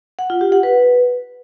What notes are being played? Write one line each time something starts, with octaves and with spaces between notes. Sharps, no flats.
F#5
F4
G4
F#5
B4